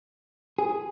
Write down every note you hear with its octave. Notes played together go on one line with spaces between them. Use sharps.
G#4